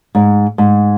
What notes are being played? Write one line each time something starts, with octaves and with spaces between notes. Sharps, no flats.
G#2
G#2